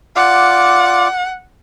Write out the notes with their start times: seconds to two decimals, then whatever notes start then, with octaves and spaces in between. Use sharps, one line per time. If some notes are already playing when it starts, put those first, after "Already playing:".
0.16 F4 D5 F#5 D6